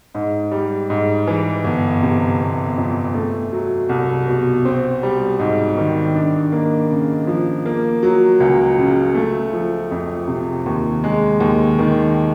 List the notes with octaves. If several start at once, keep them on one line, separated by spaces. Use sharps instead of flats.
G#2
G3
G#2
E3
G1
C3
G1
F2
A3
F#3
C2
B2
C4
G3
G#2
D#3
D4
A#3
C#3
F3
A#3
F#3
C#2
C#3
A3
F3
F2
C3
D#2
G#3
D#2
D#3